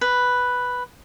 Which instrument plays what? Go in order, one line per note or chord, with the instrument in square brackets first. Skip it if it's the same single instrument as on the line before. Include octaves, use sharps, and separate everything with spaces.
[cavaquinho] B4